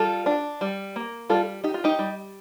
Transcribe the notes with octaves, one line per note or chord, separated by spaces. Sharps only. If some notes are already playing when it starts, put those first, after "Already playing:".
Already playing: G3 F4 A4
D4
G3
A#3
G3 F4 A4
D#4 G4
F4
D#4 G4
G3